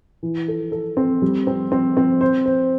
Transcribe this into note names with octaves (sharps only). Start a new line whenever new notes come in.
E3
A4
A4
C4
G3
C4
C4
C4
C5
C5